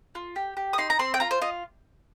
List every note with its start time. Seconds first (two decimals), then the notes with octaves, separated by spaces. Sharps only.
0.15 F4
0.36 G4
0.57 G4
0.73 D#6
0.78 D#4 C6
0.90 A#5
0.99 C4 C6
1.14 G5
1.20 F4 A#5
1.31 C5
1.42 F4 D#5